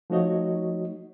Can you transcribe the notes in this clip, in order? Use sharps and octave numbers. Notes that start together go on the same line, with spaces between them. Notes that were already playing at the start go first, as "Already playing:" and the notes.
F3 A3 D#4 F#4 C#5 D#5